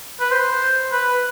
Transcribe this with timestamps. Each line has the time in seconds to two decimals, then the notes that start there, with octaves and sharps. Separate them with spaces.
0.20 B4
0.31 C5
0.92 B4